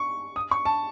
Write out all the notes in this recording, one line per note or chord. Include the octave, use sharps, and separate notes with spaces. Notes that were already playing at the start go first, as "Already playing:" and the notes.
Already playing: C#6
D#6
C#6
A5